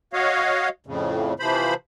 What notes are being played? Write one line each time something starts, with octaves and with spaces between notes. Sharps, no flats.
F#4 C#5 D#5 F5
F2 A2 C#3
C3 E3 F3 C5 B5